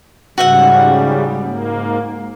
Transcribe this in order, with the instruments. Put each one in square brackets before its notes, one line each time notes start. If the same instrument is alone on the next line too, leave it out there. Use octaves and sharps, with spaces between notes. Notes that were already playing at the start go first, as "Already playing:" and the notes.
[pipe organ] G#2 C#3 G3 [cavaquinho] F#4 E5 F#5
[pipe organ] G#2 A#3